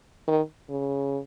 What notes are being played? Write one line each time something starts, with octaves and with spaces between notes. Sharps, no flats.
D#3
C#3